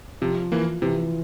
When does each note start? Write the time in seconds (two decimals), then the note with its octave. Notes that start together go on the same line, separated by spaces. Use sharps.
0.21 C3 F3
0.52 E3 A#3
0.82 C3 E3